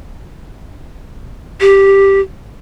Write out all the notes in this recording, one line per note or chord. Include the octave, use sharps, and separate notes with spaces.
G4